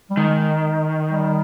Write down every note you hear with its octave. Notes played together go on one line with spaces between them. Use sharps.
G3
D#3 G#3
G3